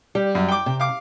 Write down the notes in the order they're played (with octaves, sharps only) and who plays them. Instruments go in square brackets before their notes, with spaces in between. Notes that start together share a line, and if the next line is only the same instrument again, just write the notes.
[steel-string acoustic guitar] G3 [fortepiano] G4
[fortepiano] F#2
G5 D6
[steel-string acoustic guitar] C3
[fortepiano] F5 D6